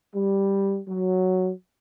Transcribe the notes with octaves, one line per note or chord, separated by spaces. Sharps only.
G3
F#3